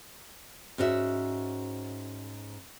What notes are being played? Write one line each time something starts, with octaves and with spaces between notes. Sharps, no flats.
G#2 C#4 F#4 C5 E5